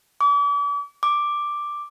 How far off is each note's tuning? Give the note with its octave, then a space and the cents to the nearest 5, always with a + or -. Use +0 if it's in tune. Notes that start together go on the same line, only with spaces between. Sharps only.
D6 -40
D6 +5